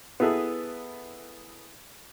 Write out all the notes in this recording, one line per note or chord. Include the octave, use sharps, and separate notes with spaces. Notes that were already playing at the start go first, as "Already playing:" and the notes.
B3 E4 G#4 A4 B4